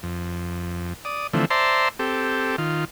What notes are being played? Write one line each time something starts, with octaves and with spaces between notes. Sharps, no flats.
F2
D5 D#6
D3 E3 F3 A3 C4
C5 D5 E5 A5 A#5 C6
C4 G4 A4
D#3 F4